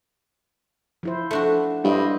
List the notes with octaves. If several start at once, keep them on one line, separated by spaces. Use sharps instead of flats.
F3 E4 C5
A3 D4 F#4
G2 E4 C5 D#5